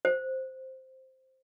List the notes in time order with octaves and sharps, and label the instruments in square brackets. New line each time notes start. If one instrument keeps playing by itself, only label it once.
[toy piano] C5